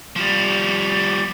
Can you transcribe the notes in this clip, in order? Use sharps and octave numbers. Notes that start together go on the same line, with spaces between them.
F3 G3